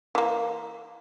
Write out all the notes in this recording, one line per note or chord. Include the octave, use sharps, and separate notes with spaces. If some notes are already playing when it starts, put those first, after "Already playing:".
E3 A#3